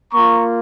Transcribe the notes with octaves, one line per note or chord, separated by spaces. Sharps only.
A#3 F4 A#5 C#6